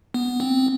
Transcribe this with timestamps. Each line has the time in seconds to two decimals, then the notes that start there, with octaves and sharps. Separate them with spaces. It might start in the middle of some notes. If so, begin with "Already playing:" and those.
0.14 B3
0.40 C4